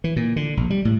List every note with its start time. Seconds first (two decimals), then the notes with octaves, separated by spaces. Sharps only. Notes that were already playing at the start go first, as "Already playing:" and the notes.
0.04 E3
0.16 A#2
0.36 D3
0.57 A#1
0.70 G3
0.85 A2